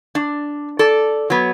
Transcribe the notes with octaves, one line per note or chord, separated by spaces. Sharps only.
D4
A4 D5
F#3 B3